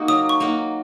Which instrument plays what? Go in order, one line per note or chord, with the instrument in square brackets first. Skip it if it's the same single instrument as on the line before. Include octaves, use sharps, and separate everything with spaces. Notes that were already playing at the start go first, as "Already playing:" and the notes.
Already playing: [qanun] A#3 D#4 F#4
[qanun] F#3 [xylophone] D#6
[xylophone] C#6
[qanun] A#3 D#4 F#4